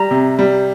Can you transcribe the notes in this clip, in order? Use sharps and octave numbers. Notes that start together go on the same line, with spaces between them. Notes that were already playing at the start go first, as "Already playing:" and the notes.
Already playing: G3 A#5
C3
G3